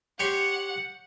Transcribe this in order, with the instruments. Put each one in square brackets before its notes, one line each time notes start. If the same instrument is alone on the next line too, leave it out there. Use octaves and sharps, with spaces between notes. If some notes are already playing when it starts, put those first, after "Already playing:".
[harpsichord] G4 C#5 C6 [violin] F#5